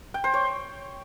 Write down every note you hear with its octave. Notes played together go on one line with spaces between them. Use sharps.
G5
C5
C#5